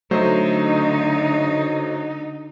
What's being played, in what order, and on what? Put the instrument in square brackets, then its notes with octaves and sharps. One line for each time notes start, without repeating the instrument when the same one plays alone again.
[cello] D3 D#4 [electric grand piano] F#3 A3 C5